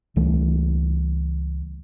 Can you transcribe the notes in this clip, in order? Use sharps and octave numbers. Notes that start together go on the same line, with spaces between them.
C#2 E3 G3 A3